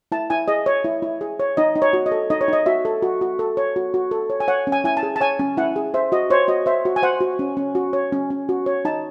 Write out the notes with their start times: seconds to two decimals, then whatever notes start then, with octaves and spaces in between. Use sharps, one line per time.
0.12 E4 A5
0.30 E4 G#5
0.48 G#4 D#5
0.66 C#5
0.84 E4
1.02 E4
1.21 G#4
1.40 C#5
1.57 D#4 D#5
1.75 D#4
1.82 C#5
1.93 F#4
2.06 D#5
2.12 A4
2.30 D#4 D#5
2.41 C#5
2.48 D#4 D#5
2.66 F#4 E5
2.85 A4
3.02 F#4
3.21 F#4
3.39 A4
3.57 C#5
3.76 F#4
3.94 F#4
4.11 A4
4.30 C#5
4.40 G#5
4.48 C#5 F#5
4.67 C#4
4.72 G#5
4.84 E4 G#5
4.97 A5
5.03 G#4
5.16 A5
5.21 C#5 G#5
5.39 C#4
5.57 E4 F#5
5.76 G#4
5.94 C5 E5
6.12 F#4 D#5
6.30 C5 C#5
6.48 F#4 D#5
6.66 C5 E5
6.85 F#4
6.96 G#5
7.02 C5 F#5
7.20 F#4
7.39 C#4
7.57 C#4
7.75 F#4
7.93 C#5
8.12 C#4
8.30 C#4
8.49 F#4
8.66 C#5
8.85 D#4 A5